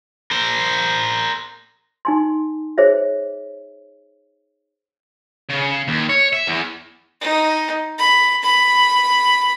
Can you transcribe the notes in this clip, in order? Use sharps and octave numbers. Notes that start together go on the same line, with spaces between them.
A#4 C5
D#4 G#5 C6
G#4 C5 C#5 E5
C#3
D#2
C#5
E5
E2
D#4
B5
B5